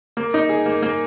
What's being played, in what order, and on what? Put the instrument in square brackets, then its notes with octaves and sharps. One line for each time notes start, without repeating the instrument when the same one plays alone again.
[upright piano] A#3
D#4
G#4
A#3
A#3